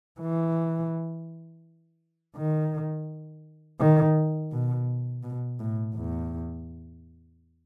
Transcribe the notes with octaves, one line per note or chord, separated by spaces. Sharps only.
E3
D#3
D#3
B2
B2
A2
E2